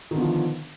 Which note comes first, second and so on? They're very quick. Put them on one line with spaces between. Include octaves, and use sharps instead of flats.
D#3 D3 B3 F3